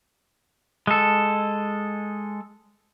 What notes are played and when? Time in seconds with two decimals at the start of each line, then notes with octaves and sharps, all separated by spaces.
0.87 G#3 A4